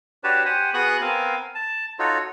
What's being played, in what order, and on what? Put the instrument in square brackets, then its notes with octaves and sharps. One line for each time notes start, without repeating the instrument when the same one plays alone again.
[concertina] D4 F#4 G4 B4 C#5 A5
G4 C5 F#5 G#5
B3 F#4 G#4 C#6 D#6 F#6
B3 C4 A#4 F5 G#5
A5
D#4 F4 F#4 A4 C#5